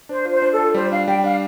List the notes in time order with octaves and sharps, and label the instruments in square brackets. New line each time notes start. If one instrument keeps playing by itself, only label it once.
[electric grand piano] D4 [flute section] C5
[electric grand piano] F4
[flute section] C5
[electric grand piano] D4
[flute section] A4
[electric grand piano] F4
[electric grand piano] G3 [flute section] C5
[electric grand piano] D4 [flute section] F5
[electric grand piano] G3 [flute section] G5
[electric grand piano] D4 [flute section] F5